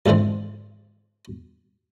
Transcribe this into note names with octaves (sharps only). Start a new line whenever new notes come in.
F2 G#2 D3 E3 C4